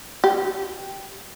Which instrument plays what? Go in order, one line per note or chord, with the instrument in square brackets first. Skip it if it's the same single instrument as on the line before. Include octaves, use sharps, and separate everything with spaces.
[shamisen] G4